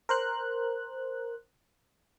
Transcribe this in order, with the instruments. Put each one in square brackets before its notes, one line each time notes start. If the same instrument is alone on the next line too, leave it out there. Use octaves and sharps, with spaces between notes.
[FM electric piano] A#4 C5 F#6